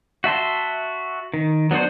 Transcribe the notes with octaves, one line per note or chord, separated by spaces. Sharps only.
F#4 E5 A5 C6
D#3
F#3 B3 D4 F#4 C5